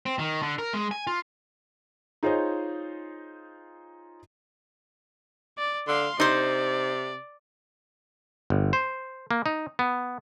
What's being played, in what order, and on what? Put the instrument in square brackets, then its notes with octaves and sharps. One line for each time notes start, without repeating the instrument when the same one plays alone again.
[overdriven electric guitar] C4
D#3
D3
A#4
G#3
G#5
F4
[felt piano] D#4 F4 G#4 C5 C#5 D#5
[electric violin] D5
[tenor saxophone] D3 [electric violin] F5 C6
[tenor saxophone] C3 [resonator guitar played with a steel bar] D#4 C5 [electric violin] D5
[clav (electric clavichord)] G1
C5
A#3
D#4
B3